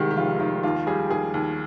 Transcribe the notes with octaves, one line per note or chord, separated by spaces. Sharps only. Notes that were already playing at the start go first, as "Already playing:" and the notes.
Already playing: C2 D#3 G#3 G4
G4
F1 F4
D#3 F4
D#2 F4
G3 G#4
D#2 G#4
D#2